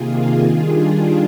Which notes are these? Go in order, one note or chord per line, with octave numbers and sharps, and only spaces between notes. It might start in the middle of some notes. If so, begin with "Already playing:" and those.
Already playing: C3 D#3 A#3 F4 G#4
D#3 G3 D4 F4 G#4